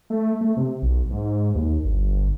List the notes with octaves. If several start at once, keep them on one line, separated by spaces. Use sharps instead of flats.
A3
A3
C3
B1
G#2
D#2
G1